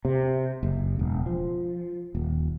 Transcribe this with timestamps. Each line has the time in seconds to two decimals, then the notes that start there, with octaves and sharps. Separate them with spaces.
0.05 C3
0.63 F#1
0.99 E1
1.26 F3
2.15 D#1